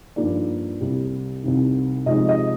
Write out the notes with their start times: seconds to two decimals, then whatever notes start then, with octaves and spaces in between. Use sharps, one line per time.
0.16 G2 F3 A#3 D#4 D5
0.80 C2 C3 G3
1.43 C2 C3 D#3
2.06 C3 F3 G#3 D#4 D#5
2.29 D#5